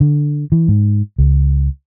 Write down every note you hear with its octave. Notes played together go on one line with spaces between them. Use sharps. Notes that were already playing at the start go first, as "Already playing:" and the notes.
D3
E3
G#2
C#2